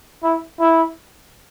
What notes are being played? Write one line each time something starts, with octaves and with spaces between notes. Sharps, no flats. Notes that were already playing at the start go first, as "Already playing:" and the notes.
E4
E4